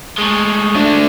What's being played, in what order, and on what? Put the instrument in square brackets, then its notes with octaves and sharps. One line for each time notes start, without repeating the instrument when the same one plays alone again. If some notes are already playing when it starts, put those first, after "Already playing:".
[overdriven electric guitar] A2 G#3
[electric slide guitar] A3 D4